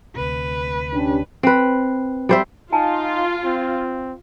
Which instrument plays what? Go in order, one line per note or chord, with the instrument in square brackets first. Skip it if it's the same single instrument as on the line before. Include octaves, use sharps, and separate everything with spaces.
[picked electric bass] D2 C3 [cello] B4
[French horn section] C#4 D4 G4
[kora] C4 B4
G3 C5 E5
[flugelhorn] D#4 [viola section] F4 [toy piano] G#5 A5
[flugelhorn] C4